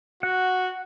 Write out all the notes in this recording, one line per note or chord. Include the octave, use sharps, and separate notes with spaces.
F#4 F#5